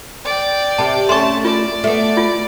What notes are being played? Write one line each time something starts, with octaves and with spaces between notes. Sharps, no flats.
D5 G5
C3 A5 B5
A3 C#4 A5 C6 C#6
F4 D5
A3 B3
F4